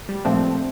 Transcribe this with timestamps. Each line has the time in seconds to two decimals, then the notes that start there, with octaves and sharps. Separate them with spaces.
0.09 G3
0.25 A#2 F3 A3 C4 D4